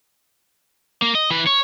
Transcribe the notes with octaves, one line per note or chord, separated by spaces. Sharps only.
A#3
D#5
E3 B4
C#5